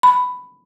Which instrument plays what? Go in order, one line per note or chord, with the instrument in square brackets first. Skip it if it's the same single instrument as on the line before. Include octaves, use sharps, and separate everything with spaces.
[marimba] B5